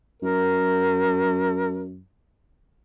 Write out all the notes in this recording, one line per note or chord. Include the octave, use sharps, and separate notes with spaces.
F#2 A#4